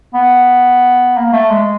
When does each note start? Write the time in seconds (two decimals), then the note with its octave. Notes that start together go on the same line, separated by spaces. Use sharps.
0.15 B3
1.17 A#3
1.33 A3
1.50 G#3